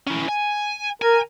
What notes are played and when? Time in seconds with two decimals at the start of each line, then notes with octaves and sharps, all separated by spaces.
0.07 C#4 E4
0.29 G#5
1.02 A#4 G#5